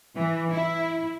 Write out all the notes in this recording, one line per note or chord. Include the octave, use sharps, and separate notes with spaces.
E3
E4